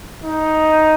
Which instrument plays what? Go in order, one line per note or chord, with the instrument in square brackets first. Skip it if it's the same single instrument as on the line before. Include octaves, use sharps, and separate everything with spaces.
[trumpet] D#4